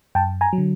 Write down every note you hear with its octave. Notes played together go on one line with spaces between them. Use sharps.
F#2 G5 A5
G#5 A#5
F#3
D3